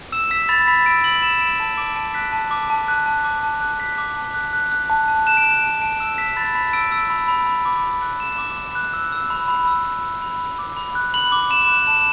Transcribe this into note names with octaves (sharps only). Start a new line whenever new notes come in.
E6 E7
E6 B6
B5 A6
B5 B6
E6 D7
E6 F#7
B5 E7
B5 D7
A5
D6 D7
A5 D7
F#6 B6
A5
D6
A5
F#6
A5
D6
A5
F#6
A5 B6
D6
A5
F#6
F#6
F#6
A5
A5
F#6 E7
D7
F#6 E7
A5 E7
A5 D7
E6 E7
E6 B6
B5 A6
B5 B6
E6 D7
E6
B5
B5
B5
D6
B5
F#6
B5 E7
D6
B5
F#6
E6
E6
B5
B5
E6
E6
B5
B5
B5
D6
B5
F#6
B5 F#7
D6
B5 E7
F#6
A5 E7